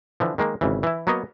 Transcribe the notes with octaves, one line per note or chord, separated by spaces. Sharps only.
D3 E3 F3
D#3 G#3 A#3
G#1 C#3 E3
E3 E4
F#3 A#3 B3 C#5 D#5